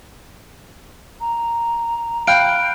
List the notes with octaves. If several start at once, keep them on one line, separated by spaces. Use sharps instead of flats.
A#5
F5 G5 B5 F6 F#6 D7